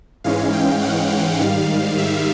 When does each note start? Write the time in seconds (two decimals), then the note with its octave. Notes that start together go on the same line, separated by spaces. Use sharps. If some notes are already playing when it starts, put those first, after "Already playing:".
0.24 G#2 E3 G#3 C#4 F5
0.53 G5
0.82 F#5
1.41 G#2 D#3 G3 F5
1.98 E5